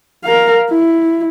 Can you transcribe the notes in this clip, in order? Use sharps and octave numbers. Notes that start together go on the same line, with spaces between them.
A#4 F5
E4